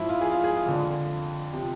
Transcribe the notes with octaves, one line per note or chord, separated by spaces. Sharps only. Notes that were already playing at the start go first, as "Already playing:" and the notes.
Already playing: G#2 F3 E4
F4
G#4
F4
G#4
F4
F2 D3 F3
C3 F3